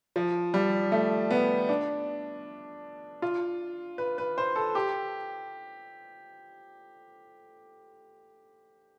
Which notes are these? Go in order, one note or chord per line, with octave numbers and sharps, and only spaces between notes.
F3
G3
A3
B3
D4
F4
B4
B4
C5
A4
G4